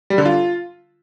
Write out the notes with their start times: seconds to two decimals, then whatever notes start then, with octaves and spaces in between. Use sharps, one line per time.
0.10 G3
0.18 D3
0.25 F4